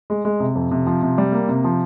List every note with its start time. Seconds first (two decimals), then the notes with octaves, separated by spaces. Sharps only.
0.10 G#3
0.25 G#3
0.40 C3
0.55 F2
0.71 C3
0.87 F3
1.03 C3
1.18 G3
1.32 A#3
1.49 C3
1.64 F3